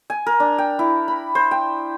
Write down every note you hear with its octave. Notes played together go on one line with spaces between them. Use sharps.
G#5
A#4
D4
G5
E4
B5
C5
G5